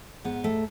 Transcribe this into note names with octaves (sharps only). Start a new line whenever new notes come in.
G#2 B3
A3